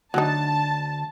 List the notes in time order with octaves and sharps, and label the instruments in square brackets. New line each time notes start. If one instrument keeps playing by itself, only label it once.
[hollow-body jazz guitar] D2 D3 [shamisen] F#3 D#4 [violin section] A5